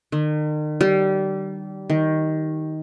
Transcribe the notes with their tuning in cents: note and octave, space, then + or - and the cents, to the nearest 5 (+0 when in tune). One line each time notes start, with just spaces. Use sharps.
D#3 -40
G3 -25
D#3 +10